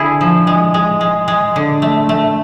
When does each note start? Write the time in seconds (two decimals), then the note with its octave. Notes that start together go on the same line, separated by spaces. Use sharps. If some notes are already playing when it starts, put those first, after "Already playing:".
Already playing: D3 E4 G#4
0.21 F3
0.47 G#3
0.74 G#3
1.01 G#3
1.28 G#3
1.56 D3
1.82 A3
2.09 A3